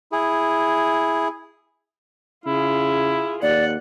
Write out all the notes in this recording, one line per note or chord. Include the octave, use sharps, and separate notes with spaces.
E4 G#4
C#3 E4 F4 G#4
D#2 D5 F#5